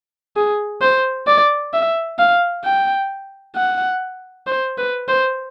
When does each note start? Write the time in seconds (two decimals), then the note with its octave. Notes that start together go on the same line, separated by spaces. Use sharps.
0.36 G#4
0.81 C5
1.27 D5
1.73 E5
2.18 F5
2.64 G5
3.56 F#5
4.47 C5
4.78 B4
5.08 C5